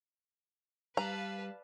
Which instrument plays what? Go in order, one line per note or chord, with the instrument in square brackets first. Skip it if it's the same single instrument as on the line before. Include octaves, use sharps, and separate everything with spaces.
[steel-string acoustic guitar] G3 [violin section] B4 F5 A5 [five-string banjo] A#5